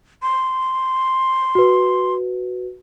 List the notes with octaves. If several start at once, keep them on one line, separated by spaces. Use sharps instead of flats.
C6
F#4 B4